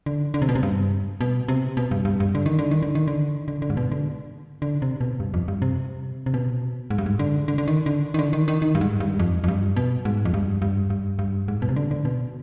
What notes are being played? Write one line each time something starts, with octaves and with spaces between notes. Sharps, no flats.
D3
D3
C3
B2
C3
G2
B2
C3
B2
G2
G2
G2
D3
D#3
D3
D#3
D3
D#3
D3
D3
D3
G#2
B2
D3
D3
C3
B2
G2
F2
G2
C3
C3
B2
G#2
G2
G#2
D3
D3
D3
D#3
D3
D#3
D3
D#3
D#3
D#3
G2
G#2
G2
F2
F2
G2
B2
G#2
F2
G2
G2
G2
G2
G#2
B2
C3
D3
D3
B2